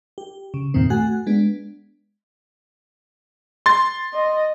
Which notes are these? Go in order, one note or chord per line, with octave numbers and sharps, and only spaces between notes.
G4
C#3
E2 G2 A#2 D#3 C4
A3 F#4 F#5 G#5 F#6
G#3 B3 D4
C6 A6
D#5